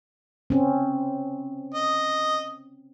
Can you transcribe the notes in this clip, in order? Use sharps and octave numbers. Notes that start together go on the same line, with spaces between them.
C4 C#4
D#5